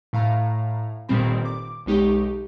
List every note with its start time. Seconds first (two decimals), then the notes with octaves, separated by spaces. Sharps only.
0.13 A2 F5 A#5
1.09 G1 A#2 D#3 G3 C4 B5
1.45 D6
1.86 B1 G#3 D#4 G4 C#6